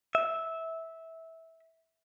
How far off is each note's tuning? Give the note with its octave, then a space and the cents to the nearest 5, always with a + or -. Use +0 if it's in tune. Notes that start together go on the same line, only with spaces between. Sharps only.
E5 -15